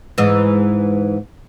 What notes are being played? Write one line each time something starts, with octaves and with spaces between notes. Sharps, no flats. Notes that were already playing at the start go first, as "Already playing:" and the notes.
G#2 E3